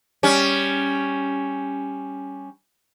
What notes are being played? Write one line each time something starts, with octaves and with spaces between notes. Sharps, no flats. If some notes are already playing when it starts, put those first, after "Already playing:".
G3 C#4